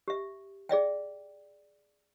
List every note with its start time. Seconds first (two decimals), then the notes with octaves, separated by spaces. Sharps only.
0.08 G4 E5
0.69 G#4 D5 E5 G5